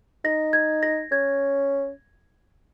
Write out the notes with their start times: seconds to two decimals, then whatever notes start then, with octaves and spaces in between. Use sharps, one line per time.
0.25 D#4 A#6
0.53 G#6
0.83 A#6
1.11 C#4 G#6